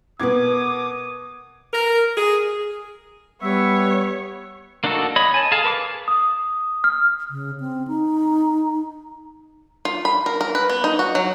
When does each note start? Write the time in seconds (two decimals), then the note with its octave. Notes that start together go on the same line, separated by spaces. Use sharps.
0.20 B2 A#4 B4 D6 D#6 G#6
1.74 A#4
2.17 G#4
3.42 G3 B3 C#5 E5
4.84 A#3 D4 D#4 F#4 A4
5.16 C#5 D#5 B5
5.34 G#5 A5
5.52 G#4 A4 F5 A5
5.64 A#4 B4 C#6 D6
6.08 D#6
6.84 F6
7.30 C#3
7.60 C4
7.88 D#4
9.85 F4
10.05 B5
10.26 A#4
10.41 A#4
10.55 B4
10.70 B3
10.84 D#4
10.99 F#4
11.15 F#3